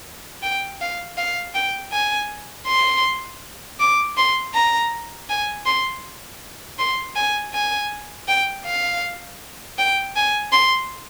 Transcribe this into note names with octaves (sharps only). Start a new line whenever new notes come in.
G5
F5
F5
G5
G#5
C6
D6
C6
A#5
G#5
C6
C6
G#5
G#5
G5
F5
G5
G#5
C6